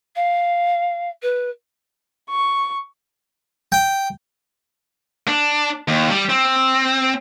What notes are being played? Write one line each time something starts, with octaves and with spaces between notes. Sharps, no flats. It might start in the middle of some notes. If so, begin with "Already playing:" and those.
F5
B4
C#6
G5
D4
D#2
G3
C4